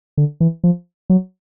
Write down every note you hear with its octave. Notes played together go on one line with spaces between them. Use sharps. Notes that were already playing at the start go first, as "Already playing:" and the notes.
D3
E3
F3
F#3